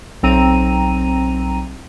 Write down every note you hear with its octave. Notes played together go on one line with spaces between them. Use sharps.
B1 C4 A#5 D#7